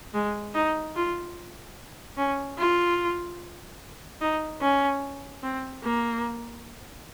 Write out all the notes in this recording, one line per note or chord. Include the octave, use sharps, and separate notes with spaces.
G#3
D#4
F4
C#4
F4
D#4
C#4
C4
A#3